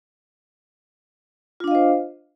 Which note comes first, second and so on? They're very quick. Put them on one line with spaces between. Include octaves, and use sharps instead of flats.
F4 D4 F5 D#5 C5